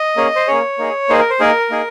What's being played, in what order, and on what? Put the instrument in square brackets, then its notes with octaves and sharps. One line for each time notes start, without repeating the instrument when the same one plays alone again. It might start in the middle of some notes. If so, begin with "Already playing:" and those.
Already playing: [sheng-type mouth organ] D#5
A#3 C#4 G#4
C5
A#3 C#4 G#4 C#5
A#3 D#4 G#4
A#3 D#4 G#4 C5
A#4
C5
A#3 D#4 G#4 A#4
A#3 D#4 G#4